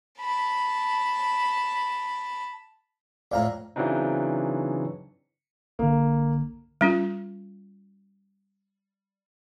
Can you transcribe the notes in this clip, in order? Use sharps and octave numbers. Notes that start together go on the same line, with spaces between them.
A5 B5
F2 A2 D5 F5 A#5
C#3 E3 F#3 C4 D4 D#4
A#1 D3 A#3
G3 C#4 F4